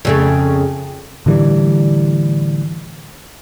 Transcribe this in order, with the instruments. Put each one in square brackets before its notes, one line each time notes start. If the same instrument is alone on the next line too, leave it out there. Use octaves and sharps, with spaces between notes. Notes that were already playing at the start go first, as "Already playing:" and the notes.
[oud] F2 C#3 A3
[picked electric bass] A2 D3 E3 G3